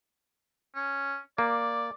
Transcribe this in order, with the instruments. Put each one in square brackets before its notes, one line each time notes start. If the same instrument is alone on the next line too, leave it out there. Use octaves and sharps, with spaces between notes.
[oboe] C#4
[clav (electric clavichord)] A#3 [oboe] D5